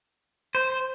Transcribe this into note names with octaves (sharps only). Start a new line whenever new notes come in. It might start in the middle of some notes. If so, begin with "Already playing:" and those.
C5